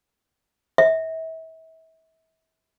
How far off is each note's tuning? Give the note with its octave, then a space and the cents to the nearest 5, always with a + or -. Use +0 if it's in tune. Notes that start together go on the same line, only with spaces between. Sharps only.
E5 -35